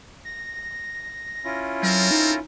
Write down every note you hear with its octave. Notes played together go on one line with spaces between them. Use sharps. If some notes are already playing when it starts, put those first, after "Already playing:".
A#6
C#4 E4 F4
F#3 C4 A4 A#4
D#4